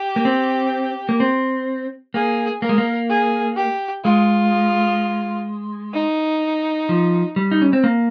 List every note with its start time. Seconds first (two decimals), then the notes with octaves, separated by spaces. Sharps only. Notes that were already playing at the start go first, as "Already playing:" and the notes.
Already playing: G4
0.16 A#3
0.25 C4
1.09 A#3
1.20 C4
2.14 A#3 G#4
2.62 A#3 A#4
2.69 G#3
2.78 A#3
3.10 G#4
3.56 G4
4.04 G#3 F4
5.94 D#4
6.89 F3
7.36 G3
7.51 D#4
7.61 C#4
7.73 C4
7.84 A#3